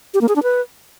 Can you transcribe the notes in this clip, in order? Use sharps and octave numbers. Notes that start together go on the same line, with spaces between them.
G4
A#3
G#4
D4
B4